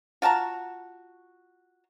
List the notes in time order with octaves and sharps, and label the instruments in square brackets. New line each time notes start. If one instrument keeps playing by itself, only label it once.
[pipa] F4 F#4 A5 A#5